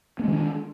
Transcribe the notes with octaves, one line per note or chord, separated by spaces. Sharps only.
D#3 G#3 B3 D4